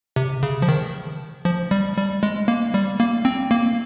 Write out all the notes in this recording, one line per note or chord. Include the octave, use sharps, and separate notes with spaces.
C3
C#3
F3
D#3
F3
G3
G3
G#3
A#3
G3
A#3
C4
A#3